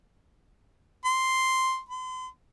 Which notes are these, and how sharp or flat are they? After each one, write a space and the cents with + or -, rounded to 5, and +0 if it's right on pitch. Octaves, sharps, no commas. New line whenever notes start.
C6 +0
C6 -40